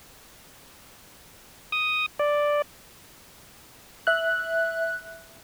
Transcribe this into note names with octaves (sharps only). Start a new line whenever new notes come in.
D#6
D5
E5 F#6